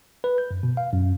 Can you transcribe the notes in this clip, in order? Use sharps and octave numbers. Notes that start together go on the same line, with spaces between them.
B4
G6
F#2
B2
F5
F#2